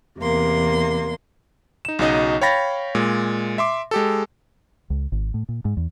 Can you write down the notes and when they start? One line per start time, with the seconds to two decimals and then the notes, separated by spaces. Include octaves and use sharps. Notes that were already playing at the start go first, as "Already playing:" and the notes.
0.19 E2 C3 A#3 C6
1.85 D#4 E7
1.99 B1 C#3 F#3 D#4 D#5
2.41 C#5 F5 G5 B5 A6 A#6
2.95 A#2 G#3
3.58 E5 C6 D6
3.91 G#3 G4 A4
4.90 C#2
5.12 G#1
5.34 A2
5.49 A#2
5.65 G#2
5.77 E2